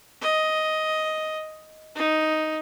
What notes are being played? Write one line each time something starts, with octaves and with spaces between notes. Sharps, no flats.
D#5
D#4